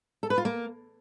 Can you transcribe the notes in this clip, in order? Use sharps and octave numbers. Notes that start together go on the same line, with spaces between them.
A4
B4
F4
A#3